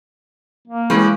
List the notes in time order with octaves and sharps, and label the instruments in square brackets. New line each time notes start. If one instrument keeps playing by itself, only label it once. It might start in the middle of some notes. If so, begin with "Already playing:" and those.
[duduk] A#3
[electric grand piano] E3 G#3 [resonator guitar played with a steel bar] G3 C#4 B4